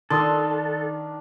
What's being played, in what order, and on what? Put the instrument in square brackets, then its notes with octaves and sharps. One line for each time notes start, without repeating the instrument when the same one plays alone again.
[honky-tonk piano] D#3 C6 D#6 [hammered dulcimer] D4 [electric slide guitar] A4